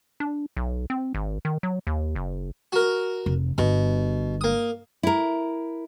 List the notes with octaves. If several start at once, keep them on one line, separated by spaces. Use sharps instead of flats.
D4
B1
C4
G#1
D#3
F#3
D#2
F#1
F#4 A#4
F1
G1 B2
A#3 D#6
E4 A#4